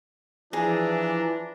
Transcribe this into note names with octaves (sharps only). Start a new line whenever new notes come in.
E3 F3 D4 G#4 A#5